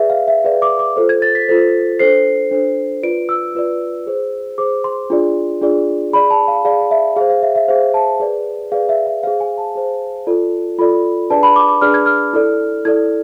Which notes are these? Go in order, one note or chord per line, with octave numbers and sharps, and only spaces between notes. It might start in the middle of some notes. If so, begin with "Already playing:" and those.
Already playing: G#4 B4 D5 E5
F5
E5
G#4 B4 D5 F5
D6
D6
F4 A4 C5
G#6
A6
B6
F4 A4 C5
D4 A4 C5 C7
D4 A4 C5
F4 B4 D5 D7
E6
F4 B4 D5
G#4 C5
G#4 C5 D6
C6
D4 F4 G#4 D5
D4 F4 G#4 D5
G#4 D5 B5
A5
F5
G#4 D5 F5
E5
G#4 C5 F5
F5
E5
E5
G#4 C5 F5
F5
A5
G#4 B4 D5
G#4 B4 D5 F5
E5
E5
G#4 C5 F5
G#5
A5
G#4 C5
F4 A4 D5
F4 A4 D5 B5
D4 G#4 B4 D5 A5
B5
D6
D6
D4 G#4 B4 D5 F6
G#6
F6
E4 A4 D5
E4 A4 D5 G#6